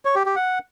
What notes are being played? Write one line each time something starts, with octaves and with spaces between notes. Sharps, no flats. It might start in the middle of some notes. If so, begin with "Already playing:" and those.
C#5
G4
G4
F#5